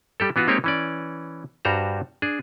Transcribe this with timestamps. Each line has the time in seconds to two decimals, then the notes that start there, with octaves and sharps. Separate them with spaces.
0.20 G3 G4 A4
0.36 E3 B3 F4 F#4
0.48 G#3 A#3 C4 D#4 G4 C#5
0.64 E3 C#4 D5
1.65 G2 G3 F#4 C5 A#5
2.22 D4 G#4